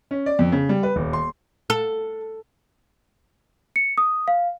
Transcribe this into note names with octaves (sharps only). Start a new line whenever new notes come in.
C#4
D5
F2
C#3
G3
B4
D#1
C6
A4
C#7
D#6
F5